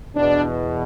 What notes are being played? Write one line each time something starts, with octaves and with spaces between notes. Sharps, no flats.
E2 B2 D4